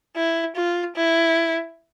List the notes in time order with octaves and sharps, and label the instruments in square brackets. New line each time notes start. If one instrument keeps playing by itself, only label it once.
[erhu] E4
F4
E4